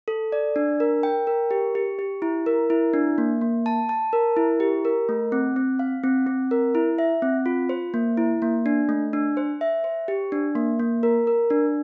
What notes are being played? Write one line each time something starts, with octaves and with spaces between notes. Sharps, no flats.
A4
D5
D4
A#4
G5
A#4
G4
G4
G4
E4
A#4
E4
D4
A#3
A#3
A5
A5
A#4
E4
G4
A#4
A3
C4
C4
F5
C4
C4
A#4
E4
E5
C4
F4
C5
A#3
E4
A#3
D4
A3
D4
C5
E5
C5
G4
D4
A#3
A#3
A#4
A#4
D4